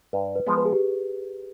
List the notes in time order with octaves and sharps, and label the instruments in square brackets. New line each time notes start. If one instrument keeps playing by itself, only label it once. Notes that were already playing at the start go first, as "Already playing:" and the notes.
[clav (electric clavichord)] G2 [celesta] B4
[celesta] B4
[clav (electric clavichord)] F3 G#3 B3
[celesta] B4
G#4
G4